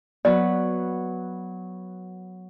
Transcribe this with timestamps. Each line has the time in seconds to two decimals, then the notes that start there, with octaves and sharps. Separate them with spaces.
0.25 F#3 B3 B4 D5